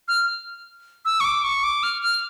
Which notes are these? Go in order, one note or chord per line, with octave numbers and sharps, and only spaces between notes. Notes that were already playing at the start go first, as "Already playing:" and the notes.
F6
E6
C#6
D6
C#6
D6
F6
F6